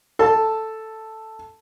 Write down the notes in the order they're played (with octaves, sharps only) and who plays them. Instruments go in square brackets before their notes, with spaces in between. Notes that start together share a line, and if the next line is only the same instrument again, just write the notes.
[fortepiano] A4 A5